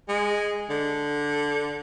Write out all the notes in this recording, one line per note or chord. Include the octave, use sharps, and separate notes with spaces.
G#3
D3